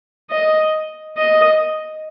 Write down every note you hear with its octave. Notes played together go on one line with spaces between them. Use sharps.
D#5
D#5